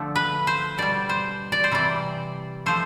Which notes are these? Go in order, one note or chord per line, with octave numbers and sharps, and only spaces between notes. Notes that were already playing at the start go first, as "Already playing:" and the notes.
Already playing: D3 F3 A3
B4
C5
B2 G3 D5
C5
D5
C5
C3 E3 G3 D5
C3 F3 A3 C5